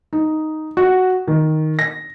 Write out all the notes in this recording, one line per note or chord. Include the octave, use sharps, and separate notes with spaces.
D#4
F#4
D#3
A#6